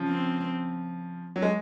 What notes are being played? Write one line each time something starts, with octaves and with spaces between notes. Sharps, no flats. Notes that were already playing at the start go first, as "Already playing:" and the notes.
Already playing: C#3 F3
C4
F#3
G#3